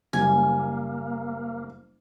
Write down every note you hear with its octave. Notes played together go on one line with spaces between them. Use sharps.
F#1 G3 A#3 G#5